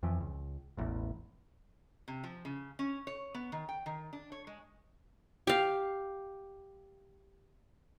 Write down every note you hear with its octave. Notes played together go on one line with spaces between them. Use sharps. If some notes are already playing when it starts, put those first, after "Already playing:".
F2 E3 F3
C#2
E1 A1 E2
C3
F3
C#3
C#4
C#5
B3
D#3
G5
D#3
D4
C#5
G#3
G4 F5